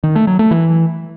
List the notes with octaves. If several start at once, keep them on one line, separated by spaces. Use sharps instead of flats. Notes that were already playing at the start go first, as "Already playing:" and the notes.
D#3
A3
F#3
A3
E3